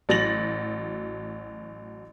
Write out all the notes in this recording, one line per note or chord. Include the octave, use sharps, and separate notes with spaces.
A1 F#3 A6 A#6 F#7